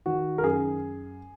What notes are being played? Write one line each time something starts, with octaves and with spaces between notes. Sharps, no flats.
D#3 F#4
A#4
F#2 G#4